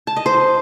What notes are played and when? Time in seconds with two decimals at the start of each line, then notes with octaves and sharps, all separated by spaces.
0.07 A5
0.16 D#5
0.26 C5